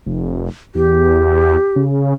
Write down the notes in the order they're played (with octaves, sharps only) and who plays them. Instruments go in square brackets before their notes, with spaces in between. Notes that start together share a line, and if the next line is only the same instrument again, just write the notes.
[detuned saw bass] F1
[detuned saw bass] E2 [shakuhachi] G4
[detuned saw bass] C#3